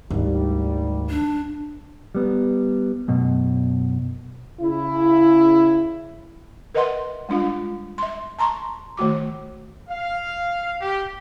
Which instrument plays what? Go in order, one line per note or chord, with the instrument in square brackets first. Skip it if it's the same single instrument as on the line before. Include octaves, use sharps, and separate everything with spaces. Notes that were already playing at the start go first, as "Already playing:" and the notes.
[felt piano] G#1 [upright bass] D2 D#3 [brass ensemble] G3
[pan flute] D4
[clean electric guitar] G3 B3
F#2 B2
[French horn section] C#3 E4
[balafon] A#4 B4 D#5 E5 F#5 C6
G3 G#3 D4 F4
E5 C6
A5 A#5 C6 C#6
D#3 A3 F#4 D6
[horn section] F5
G4